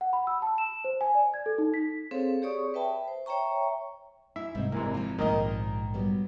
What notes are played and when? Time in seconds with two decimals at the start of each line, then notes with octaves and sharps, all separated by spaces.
0.01 F#5
0.13 B5
0.27 E6
0.42 A5
0.58 E7
0.84 C5
1.01 G#5
1.15 D5
1.34 G#6
1.46 A4
1.58 D#4
1.74 B6
2.11 C4 G#4 A4 C5 C#5 F5
2.42 G4 G#4 C#5 D5 C#6 D#6
2.74 B4 E5 G5 A5 B5
3.08 C5
3.26 C#5 E5 G5 A#5 C#6
4.36 E4 E5
4.55 G#2 C3 C4
4.72 G#1 C3 E3 G#3 A#3
4.94 F3 F4
5.18 A#1 G#2 D#3 A#3 D#5
5.94 F#3 G3 B3